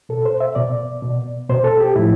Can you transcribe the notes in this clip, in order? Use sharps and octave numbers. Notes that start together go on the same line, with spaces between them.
B2 A4
C5
E5
B2 D5
B2
B2 C5
A4
G4
A2 F3 E4